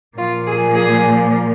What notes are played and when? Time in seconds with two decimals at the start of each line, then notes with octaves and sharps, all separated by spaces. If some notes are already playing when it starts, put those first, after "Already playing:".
0.18 A#2 F3 A#3 F4
0.47 G#4
0.75 G#4